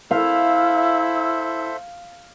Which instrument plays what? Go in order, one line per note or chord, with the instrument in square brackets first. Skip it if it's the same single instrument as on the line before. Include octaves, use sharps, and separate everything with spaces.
[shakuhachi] E4 [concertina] A4 C5 E5 [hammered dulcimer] F5